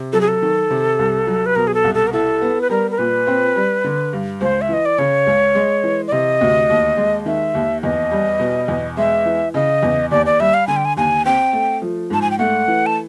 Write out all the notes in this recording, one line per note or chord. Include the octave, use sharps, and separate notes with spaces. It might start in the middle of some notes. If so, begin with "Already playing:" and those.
Already playing: C3
F#3 A4
G#4
A4
D#3
C3
C2
F#3
B4
B2 A#4
G#4
A4
C2
A4
A#4
E4 A4
B3
B4
G3 A#4
A#4
A#2 B4
C4
G3
D3
G2
C#2 C5
E5
E3 D#5
D5
C#3 C#5
C#2
G#3
E3
D5
C3 D#5
D2
D#2
G#3
D#3 E5
D#2
E2 D#5
G3
B2
E2
G#3 E5
E3
C#3 D#5
E2
D#2 D5
D5
G3 E5
F5
D3 G#5
G5
G#5
D#2 G#5
C4 G5
A3
F3
G#2 A5
G#5
G5
A3 F#5
E3
A5